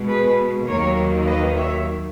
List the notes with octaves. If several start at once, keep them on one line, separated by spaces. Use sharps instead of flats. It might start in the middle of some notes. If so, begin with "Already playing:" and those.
Already playing: B2 G#3
G#4 B4
D#2 D#3 F#3 A#3 A#4 C#5
B4 D#5
C#5 E5